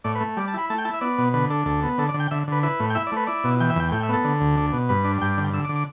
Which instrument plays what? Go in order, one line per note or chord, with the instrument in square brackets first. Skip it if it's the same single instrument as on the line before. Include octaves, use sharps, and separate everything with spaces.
[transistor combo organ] A2 D5
B4
A3
G3 D5
A5
E4 B5
A3 A5
G5
E4 A5
E5
B3 D5
B2
D3 B4
D4 A4
D2 A4
B3
D3 A4
D5
D3
G5
D3 E5
D3 B4
E4 B4
A2
G5
E4 E5
D5
A3 B4
E4 D5
B2
E3 G5
E5
E2 G5
A2 G5
E5
B3 A4
D3
D2
D4
B2
G2 B4
D4
G2 G5
D3
D3 E6
D6
D3
D6